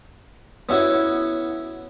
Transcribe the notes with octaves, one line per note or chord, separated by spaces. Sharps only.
B3 C#4 E4 F#4 C#5